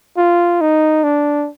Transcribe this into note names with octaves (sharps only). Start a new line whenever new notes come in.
F4
D#4
D4